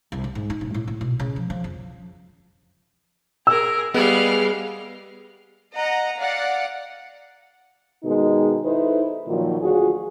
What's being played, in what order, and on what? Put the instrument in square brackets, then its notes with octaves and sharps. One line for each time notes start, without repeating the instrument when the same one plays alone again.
[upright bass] C2
C4
G#2
D#4
D#1
A2
A2
B2
C#3
F3
F3
F2
[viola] G#4 A#4 [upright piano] E6
[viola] G3 F5 [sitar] G#3 [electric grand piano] B3
[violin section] D#5 F#5 A#5
D5 F5 F#5
[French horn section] B2 D#3 G#3 D#4
D#4 E4 A4 B4 C5
A#2 D#3 F3 F#3
D2 F4 F#4 G#4